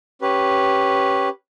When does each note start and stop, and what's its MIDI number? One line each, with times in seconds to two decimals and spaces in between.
0.22 1.29 61
0.22 1.29 67
0.22 1.29 71